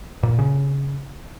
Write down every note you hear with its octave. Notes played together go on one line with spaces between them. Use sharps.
A#2
C#3